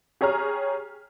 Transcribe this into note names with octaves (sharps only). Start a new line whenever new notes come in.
G4 G#4 C#5 A#5 F6